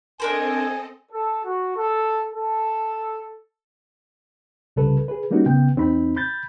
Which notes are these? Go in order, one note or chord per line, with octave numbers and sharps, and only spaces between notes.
C4 D4 A4 A#4 C5 D#5 G#5
A4
F#4
A4
A4
C2 C#3 G3 A4 B4
G#4 B4
G3 A#3 C#4 D#4 F#4
C#3 B3 G5
E2 C4 D#4 B5
B5 G6 A6